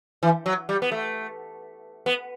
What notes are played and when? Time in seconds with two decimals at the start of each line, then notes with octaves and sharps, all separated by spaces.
0.23 E3
0.46 F#3
0.69 G3
0.82 B3
0.92 A3
2.06 B3